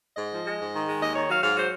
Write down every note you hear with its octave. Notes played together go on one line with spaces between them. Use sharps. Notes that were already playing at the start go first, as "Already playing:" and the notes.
G#2 D#5
F3
G#3
G#2
D#3
G#3
D#2 D#5
D#3 C#5
F#3 F5
G#2 F5
F#3 C5